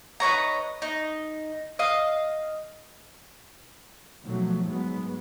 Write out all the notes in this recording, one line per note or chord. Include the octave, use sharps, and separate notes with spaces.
D#4 B4 C#5 A#5
D#4
D#5 F5
B2 D#3 F3 F#3 A3
G#2 F#3 G#3 B3